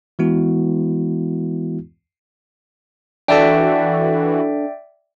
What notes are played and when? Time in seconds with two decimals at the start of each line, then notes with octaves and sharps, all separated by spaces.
0.19 E3 G#3 B3 E4 F#4
3.28 E3 D4 F#4 A4 D5 E5 G5